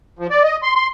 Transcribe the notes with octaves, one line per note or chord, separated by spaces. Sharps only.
F3
D5
D#5
C6
C6